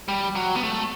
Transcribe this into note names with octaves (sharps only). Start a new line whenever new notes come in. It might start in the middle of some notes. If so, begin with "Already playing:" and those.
G3
F#3
B3
A3